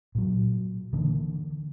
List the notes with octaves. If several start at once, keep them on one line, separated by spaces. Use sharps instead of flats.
A#2 F#3
D3 E3 A#3 D4